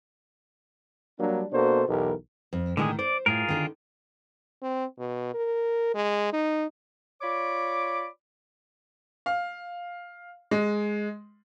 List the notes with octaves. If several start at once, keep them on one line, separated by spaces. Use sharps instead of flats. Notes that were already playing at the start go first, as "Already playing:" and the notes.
F#3 G3 A#3 D4
B2 A#3 D4 F#4 A4 C5
B1 E2 B2 E3 G4 A#4
F2
A2 D3 D#3 G#3 G#4
C5 D5
A2 F4 G#4 A#4
D3 D#3
C4
B2
A#4
G#3
D#4
F4 C#5 D5 B5 D6
F5
G#3